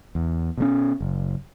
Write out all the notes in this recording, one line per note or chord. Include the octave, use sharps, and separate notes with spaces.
E2
B2 G3 C#4
F#1